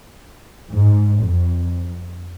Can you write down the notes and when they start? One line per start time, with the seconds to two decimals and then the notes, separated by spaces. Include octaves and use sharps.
0.74 G#2
1.21 F2